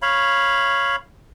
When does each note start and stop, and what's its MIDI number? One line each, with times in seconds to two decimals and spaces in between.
0.02 0.96 73
0.02 0.96 77
0.02 0.96 83